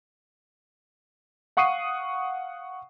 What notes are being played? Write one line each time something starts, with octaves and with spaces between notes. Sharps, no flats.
F5 F#5 C#6 D#6 C7 D#7